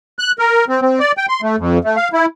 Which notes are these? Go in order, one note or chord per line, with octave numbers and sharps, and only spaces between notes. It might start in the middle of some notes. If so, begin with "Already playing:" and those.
F#6
A#4
C4
C4
D5
G5
C6
A3
F2
A3
F5
E4